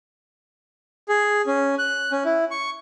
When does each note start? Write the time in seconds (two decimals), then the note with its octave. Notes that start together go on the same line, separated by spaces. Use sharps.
1.09 G#4
1.47 C#4
1.78 F#6
2.12 C#4
2.25 E4
2.51 C#6